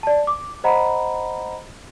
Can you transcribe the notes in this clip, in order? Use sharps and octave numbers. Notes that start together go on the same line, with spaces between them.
D5 A5
D6
C5 D#5 F#5 A#5 B5